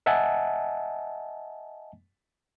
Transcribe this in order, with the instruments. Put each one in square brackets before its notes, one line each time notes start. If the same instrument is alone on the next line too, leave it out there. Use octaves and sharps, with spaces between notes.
[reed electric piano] D#5 E5 F#5 G#5 A5